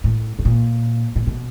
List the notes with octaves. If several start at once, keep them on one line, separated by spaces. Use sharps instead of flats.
A2
A2
A#2
A#2
B2